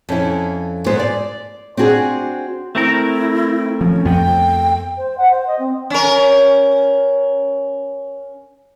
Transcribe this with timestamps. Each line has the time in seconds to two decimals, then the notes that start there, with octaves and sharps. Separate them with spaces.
0.09 F2 C#4 E4
0.86 G#2 B3 C5
0.99 D5
1.77 C4 D4 F#4 G#4
2.75 A3 C4 E4 A#4
3.81 F3 C#4
4.05 F2 F3 B3 G5
4.97 C5
5.18 F#5
5.31 C5
5.47 D#5
5.59 C4
5.90 C#4 A#4